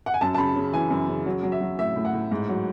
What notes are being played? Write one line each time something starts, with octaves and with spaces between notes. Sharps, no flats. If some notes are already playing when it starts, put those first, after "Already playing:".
F#5
G#5
F#2 A5
A5
C#3 B5
C#3
E3 G#5
F#2
C#3
F#3
F#3
E5
F#3
A2 E5
A2
F#5
A2
G#2
F#3